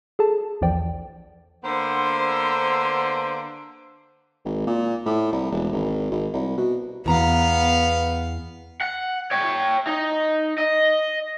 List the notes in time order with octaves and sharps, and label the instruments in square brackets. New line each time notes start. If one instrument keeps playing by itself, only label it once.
[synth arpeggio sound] G#4 A4 A5
B1 E2 E3 F3 D5 G5
[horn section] D3 A#3 B3 C5
[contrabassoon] G#1
A#2
A2
C2
E1
G#1
G#1
C2
B2
[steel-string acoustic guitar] E2 A#5 [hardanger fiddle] B3 F5
[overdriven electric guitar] F#5
C#5 G5
D#4
D#5